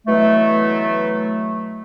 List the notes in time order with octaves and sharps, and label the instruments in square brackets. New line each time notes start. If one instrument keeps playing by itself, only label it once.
[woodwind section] B2 E3 F#3 A3